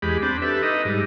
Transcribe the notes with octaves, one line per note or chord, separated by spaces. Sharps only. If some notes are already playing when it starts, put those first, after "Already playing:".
E2 G#3 G4 B5
C4 D4 B5
G4 A4 B4 E5
D#4 B4 D#5
G#2 G3